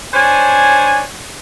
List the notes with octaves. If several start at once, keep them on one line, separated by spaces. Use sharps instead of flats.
D4 C5 C#5 G#5